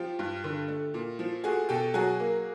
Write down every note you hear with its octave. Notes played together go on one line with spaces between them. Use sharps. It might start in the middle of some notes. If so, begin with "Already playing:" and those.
Already playing: F3 F4 G4
G2
D3
A3
A#2
F3
A3 F#4 G#4
B2 G4 A4
F#3 F#4 G#4
A#3